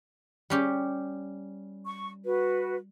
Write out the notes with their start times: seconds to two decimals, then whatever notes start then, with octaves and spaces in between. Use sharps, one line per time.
0.50 G3 C#4 G4
1.87 C#6
2.25 F#4 B4